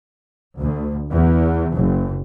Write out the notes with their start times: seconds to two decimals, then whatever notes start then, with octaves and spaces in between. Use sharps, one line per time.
0.57 D2
1.11 E2
1.73 F#1